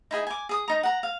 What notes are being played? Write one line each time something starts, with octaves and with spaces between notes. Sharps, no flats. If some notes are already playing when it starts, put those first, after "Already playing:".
D#4 E4 G#4 G#5
G#5 D6
G#4 D#6
D#4 A#5
F#5 A#5
F5